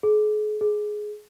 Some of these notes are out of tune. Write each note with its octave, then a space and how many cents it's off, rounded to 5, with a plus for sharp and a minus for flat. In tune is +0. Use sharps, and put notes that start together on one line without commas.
G#4 +40
G#4 +15